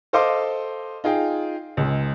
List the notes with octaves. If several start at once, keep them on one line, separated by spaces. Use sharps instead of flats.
A4 C5 D#5 F5 C6 D6
D#4 F4 G#4 G5
C#2 G#3